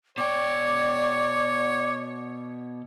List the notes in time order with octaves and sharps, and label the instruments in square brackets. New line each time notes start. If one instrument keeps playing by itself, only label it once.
[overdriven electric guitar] B2 G5 [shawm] C#5 [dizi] D5 [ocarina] D6